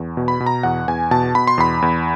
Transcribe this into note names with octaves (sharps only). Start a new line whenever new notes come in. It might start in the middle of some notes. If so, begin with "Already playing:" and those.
Already playing: E2
B2
B5
B2
A#5
E2 F#5
E2 G#5
B2 A5
B2 B5
C6
E2 B5
E2